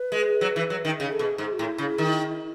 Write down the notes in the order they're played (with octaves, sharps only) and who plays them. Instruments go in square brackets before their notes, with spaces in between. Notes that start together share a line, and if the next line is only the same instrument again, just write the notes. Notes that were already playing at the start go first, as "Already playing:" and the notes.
Already playing: [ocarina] B4
[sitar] G#3
F#3
E3
F#3
D#3
[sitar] C#3 [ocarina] G#4
[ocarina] A4
[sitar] B2
[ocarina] G#4
[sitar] G#2
[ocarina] F#4
[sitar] A2 [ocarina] E4
[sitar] C#3
D#3